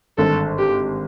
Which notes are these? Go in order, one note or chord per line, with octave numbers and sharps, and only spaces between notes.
G#1 G2 D3 A4
G4